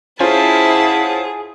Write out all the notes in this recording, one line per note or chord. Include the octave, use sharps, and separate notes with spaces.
C#4 E4 F4 G#4 C5 F#5 G#5 A5